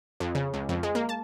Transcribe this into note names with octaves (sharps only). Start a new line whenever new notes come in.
F2
C#3
C#2
F2
G#3
A#3
A5